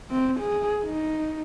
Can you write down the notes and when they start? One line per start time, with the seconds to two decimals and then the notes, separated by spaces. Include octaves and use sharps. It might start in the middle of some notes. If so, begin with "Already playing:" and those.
0.11 C4
0.40 G#4
0.84 D#4